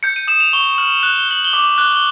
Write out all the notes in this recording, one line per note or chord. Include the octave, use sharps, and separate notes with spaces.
G6 C#7
D#7
D#6 E7
F7
C#6 G7
F6 F#7
F#6
G7
F#6 F#7
G7
D6
F#6
G7